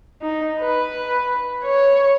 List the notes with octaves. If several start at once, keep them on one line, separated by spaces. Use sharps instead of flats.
D#4
B4
C#5